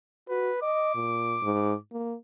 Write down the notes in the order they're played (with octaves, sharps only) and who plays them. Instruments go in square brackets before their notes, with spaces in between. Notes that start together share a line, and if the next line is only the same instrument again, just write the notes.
[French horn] F#4 [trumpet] B4
[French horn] D#5 [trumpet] D6
[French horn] A#2
G#2
A#3